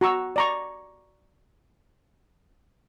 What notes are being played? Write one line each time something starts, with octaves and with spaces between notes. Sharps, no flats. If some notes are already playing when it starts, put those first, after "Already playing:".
F#4 A#5 C#6 E6
D5 A#5 C#6